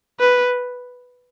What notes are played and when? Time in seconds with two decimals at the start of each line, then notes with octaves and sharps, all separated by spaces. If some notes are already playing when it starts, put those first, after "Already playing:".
0.20 B4